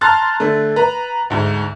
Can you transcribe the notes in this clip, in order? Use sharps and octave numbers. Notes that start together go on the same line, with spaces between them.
A5 A#5 C6 F6 F#6 A6
D3 A3
B4 A#5
D2 G#2